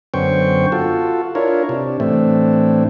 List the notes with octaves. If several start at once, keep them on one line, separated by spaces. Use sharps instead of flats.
F#2 D3 B3 C5 G5 C#6
F4 F#4 A4
D4 E4 F4 A#4 C#5
C3 D4
A2 E3 A3 C4 D4